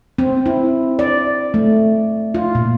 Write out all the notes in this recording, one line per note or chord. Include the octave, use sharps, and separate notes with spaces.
C4
E4
D5
A3
F4
A#2